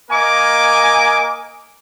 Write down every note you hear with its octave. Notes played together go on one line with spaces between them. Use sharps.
A#3 A#4 D#5 G#5 D6